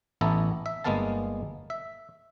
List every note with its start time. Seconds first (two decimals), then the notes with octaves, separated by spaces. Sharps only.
0.21 A1 E3 B3 E4 A4 A#5
0.66 E5
0.84 G1 G#3 A#3 B3 F5 A5
1.70 E5